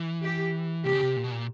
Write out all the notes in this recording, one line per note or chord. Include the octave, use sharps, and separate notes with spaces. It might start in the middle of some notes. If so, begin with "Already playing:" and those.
Already playing: E3
G4
C3 G4
C#3
C3
A#2
B2
A#2